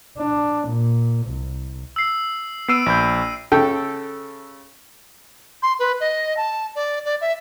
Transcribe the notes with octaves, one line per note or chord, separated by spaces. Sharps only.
D4
A#2
C2
E6 C7
B3 E6 C7 D7 D#7
A#1 B5 G6
C#3 A4 G5
C6
B4
D#5
A5
D5
D5
E5